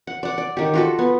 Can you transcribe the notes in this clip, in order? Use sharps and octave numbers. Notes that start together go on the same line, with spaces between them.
F#5
D5 F#5
D5
D#3 G4
F4 F#4 A4
B3